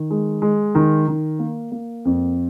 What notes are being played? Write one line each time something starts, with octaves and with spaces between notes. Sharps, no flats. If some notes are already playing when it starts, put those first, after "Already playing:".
Already playing: D#3
G#3
G#3
D#3
D#3
A#3
A#3
F2